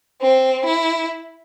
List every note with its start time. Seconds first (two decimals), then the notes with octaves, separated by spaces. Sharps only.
0.21 C4
0.66 E4